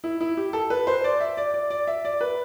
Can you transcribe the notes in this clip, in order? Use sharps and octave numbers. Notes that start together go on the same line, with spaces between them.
E4
E4
G4
A4
B4
C5
D5
E5
D5
D5
D5
E5
D5
B4